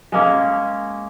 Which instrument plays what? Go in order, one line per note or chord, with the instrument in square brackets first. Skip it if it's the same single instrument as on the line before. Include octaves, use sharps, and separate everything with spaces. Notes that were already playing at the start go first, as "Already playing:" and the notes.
[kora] G#3 A#3 C#4